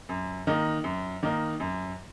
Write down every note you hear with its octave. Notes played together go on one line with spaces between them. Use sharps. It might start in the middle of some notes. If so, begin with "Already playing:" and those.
F#2
D#3 A#3 D#4
F#2
D#3 A#3 D#4
F#2